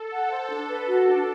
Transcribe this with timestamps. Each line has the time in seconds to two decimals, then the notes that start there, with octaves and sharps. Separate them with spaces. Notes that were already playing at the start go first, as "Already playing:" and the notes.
Already playing: A4
0.11 F#5
0.30 C5
0.49 D4
0.69 B4
0.87 F#4
1.07 D4